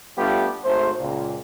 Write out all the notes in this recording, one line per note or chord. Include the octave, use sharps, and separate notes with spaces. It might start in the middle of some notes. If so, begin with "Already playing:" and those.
G3 A3 B3 D4 F4 G4
G#1 A3 C5
C#2 A#2